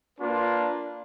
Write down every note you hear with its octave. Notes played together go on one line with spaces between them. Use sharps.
A#3 D4 F4 B4